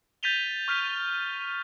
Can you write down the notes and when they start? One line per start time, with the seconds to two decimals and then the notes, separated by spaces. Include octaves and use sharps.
0.23 G6 A6 B6 D#7 F7 G7
0.68 C#6 F6 G6 B6 D#7